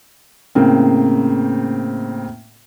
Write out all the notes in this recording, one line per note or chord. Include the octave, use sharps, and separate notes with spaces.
A2 C#3 A#3 C4